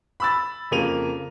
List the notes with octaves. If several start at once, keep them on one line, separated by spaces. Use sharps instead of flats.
B5 E6 A6
F2 C#3 A#3 D#7 F7